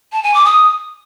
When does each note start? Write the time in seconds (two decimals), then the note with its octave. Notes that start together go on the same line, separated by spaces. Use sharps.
0.12 A5
0.23 G#5
0.34 D6
0.45 D#6